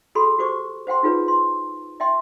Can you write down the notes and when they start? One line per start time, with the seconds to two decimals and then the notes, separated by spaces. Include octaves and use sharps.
0.15 F#4 G#4 A4 B5 C6
0.39 F#4 G4 C5 C#6 D6
0.87 C5 F#5 G5 C6
1.03 D#4 F4 G#4 B4 C#5
1.28 C6
2.00 D#5 E5 G5 C6